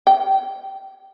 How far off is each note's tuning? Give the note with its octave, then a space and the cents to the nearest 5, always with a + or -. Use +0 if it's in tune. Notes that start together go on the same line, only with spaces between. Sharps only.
G5 -20